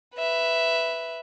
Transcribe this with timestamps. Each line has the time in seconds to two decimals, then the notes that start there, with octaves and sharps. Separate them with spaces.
0.15 B4 E5